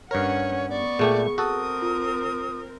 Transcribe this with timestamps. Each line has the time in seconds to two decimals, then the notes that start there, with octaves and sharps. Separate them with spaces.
0.11 G2 C#4 A#4 C#5 F#5
0.69 B3 D5 C#6
0.99 A#2 A3 G4 G#4
1.38 C4 F#4 A4 A#4 D#6
1.82 F4